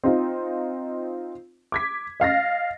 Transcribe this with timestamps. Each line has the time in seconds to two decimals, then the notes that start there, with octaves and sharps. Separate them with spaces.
0.04 C4 D#4 F4
1.72 D6 G#6 B6
2.20 D#5 F5 A6 A#6